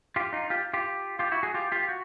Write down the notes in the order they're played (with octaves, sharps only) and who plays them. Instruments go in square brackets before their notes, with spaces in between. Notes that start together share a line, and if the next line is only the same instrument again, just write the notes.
[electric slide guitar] F4 G4
D#4 F4
F4 G4
F4 G4
F4 G4
E4 F#4
F#4 G#4
F4 G4
F4 G4
F#4